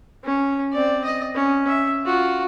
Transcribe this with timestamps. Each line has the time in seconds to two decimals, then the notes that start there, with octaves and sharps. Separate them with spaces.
0.24 C#4
0.73 C4 D5
1.05 D#5
1.35 C#4
1.68 E5
2.04 F4 F#4